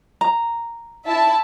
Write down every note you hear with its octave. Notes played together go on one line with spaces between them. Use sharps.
A#5
E4 E5 A5